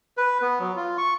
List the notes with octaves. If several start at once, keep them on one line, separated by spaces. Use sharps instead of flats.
B4
B3
F#3
F4
C#6